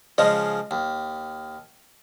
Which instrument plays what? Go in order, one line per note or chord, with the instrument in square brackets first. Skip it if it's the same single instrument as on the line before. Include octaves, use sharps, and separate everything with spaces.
[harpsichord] C#3 F3 G#3 [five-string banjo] D#5
[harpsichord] D#2